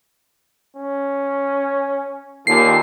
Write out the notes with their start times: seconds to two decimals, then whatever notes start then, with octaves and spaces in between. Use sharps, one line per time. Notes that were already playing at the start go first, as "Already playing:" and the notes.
0.77 C#4
2.47 D#2 A#2 A4 C7